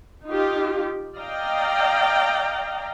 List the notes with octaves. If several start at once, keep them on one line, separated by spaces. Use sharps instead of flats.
D#4 F4 G4
D5 D#5 F5 G5 A#5